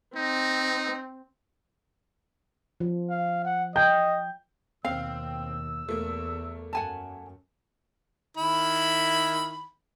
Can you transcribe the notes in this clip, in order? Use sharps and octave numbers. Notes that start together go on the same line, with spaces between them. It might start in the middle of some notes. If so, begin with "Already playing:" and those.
C4 D#4
F3
F5
F#5
D#5 G5 G6
D#2 B2 C4 F5 E6
E2 A3 A#3
F#2 F#5 G#5 A5
D#3 E4 B5